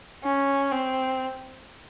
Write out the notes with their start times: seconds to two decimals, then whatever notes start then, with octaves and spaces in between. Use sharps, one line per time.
0.24 C#4
0.72 C4